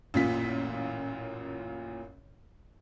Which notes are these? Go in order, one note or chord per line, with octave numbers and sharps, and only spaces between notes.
A1 F#2 A#2 F4 B6